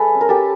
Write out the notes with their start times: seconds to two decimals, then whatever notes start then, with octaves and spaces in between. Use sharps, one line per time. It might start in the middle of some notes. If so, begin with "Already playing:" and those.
Already playing: G#3 A4 B4
0.15 C#4
0.21 A#4
0.29 G4 A4